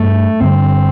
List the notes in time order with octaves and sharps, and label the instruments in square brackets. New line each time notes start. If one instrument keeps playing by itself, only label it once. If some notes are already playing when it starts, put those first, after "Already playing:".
Already playing: [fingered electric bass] G2 G3 [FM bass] A3
[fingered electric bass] G2 D3 G3 [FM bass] C4